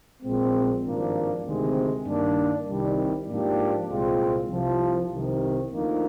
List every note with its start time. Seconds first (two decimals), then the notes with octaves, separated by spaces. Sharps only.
0.22 A#1 A#2 G#3 C4
0.83 G#1 G2 F3 A#3 D4
1.44 D2 C3 D#3 G#3 C4
2.06 G2 D#3 A#3 D4
2.66 C2 C3 D#3 G3
3.28 G#2 F3 A#3 D4 G4
3.89 C2 A#2 G#3 C4 F4
4.49 C2 C3 F3
5.11 C2 C3 D#3
5.72 D2 D3 F3 A#3 D#4